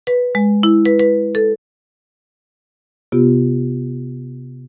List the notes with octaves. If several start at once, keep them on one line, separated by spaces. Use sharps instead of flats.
B4
G#3
E4
B4
B4
A4
C3 B3 F4 G4